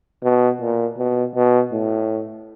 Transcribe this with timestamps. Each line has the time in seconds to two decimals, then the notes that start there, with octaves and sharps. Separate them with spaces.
0.24 B2
0.61 A#2
0.98 B2
1.35 B2
1.72 A2